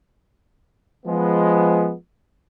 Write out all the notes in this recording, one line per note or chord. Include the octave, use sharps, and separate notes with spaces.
F3 G#3 B3